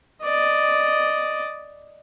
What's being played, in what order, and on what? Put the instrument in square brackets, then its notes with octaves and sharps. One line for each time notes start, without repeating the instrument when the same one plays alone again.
[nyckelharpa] D5 D#5